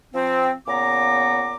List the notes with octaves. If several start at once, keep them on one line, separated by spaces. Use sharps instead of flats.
F3 C4
A#2 C#3 B3 A#5 D6